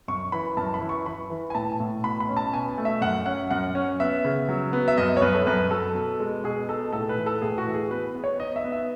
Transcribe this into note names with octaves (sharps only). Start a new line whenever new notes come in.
F#2 C#6
E3 B5
F#2 A5
B5
E3
C#6
E3 B5
E3
G#5
A2 A5
A2
B2 B5
B5
C#4
A5
B2 G#5
A3
E5
F#2 F#5
C#4 F#5
F#2 F#5
C#4
B3 E5
C#3
F#3
B3
E5
F#2 D#5
C#5
F#2 B4
A4
F#2 B4
F#3 A4
B2
G#3
B2 G#4
D#4 A4
A2 A4
B4
E3
A4
A2 G#4
F#4
E3
G#4
B3 B4
B3
C#5
D#4 D#5
E5
B3
E5